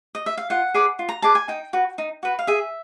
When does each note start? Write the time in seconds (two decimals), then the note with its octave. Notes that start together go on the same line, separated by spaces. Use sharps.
0.15 D#5
0.26 E5
0.38 F5
0.50 F4 F#5
0.74 G#4 B4 D5
0.99 F4
1.09 A#5
1.22 G#4 B4 D5 A5
1.35 G#5
1.48 D#4 G5
1.73 F#4 B4
1.98 D#4
2.23 F#4 B4
2.39 F5
2.47 G#4 E5